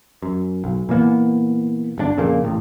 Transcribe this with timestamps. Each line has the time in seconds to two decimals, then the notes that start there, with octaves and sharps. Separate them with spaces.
0.23 F#2
0.64 B1
0.89 A#2 E3 A#3 B3
1.98 G1 C3 D4
2.17 F2 A#2 C#3 A#3
2.44 A1 A2